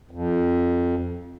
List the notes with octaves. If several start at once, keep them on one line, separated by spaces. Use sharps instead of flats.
F2